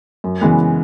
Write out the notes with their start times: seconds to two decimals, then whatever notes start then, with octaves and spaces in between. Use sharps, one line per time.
0.24 F#2
0.41 C#3 E3 G#3 B3